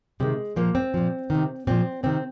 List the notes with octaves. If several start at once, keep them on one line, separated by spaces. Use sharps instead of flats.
C3 D#3 G#3
A#2 F3 A#3
C4
A#2 F3
C3 D#3
A#2 F3 C4
C3 D#3 C4